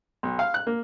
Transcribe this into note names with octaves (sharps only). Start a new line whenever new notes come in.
B1
F5
F#6
A#3